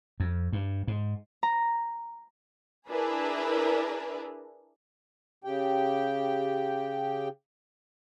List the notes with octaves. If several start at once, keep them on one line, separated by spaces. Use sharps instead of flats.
F2
G2
G#2
A#5
D4 E4 G#4 A#4 B4
C#3 G4 G5